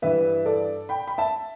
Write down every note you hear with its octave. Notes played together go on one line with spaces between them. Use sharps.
G2 E3 G3 B4 E5
A4 D5
G5 B5
B5
E5 A5